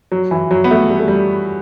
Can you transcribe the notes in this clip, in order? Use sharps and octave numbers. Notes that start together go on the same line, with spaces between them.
F#3
E3
F#3
B3
A3
G3
A3
G3